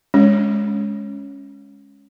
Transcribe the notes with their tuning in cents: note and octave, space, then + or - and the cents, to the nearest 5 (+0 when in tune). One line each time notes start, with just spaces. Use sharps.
G#3 +0 C#4 +0 C#5 +0